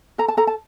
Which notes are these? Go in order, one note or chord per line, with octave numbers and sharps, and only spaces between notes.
A4 A#5
A5
A4 A#5
A5